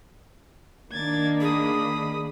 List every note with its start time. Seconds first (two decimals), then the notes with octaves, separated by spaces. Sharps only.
0.91 D#3 A#3 D4 G#6 A6
1.40 G#4 B5 D#6